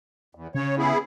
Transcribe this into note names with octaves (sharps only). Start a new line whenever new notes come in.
E2
C#3 C#5
B3 E4 G#4